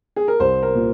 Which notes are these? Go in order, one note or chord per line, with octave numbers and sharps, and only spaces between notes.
G#4
A#4
C2 C5
A#4
A#2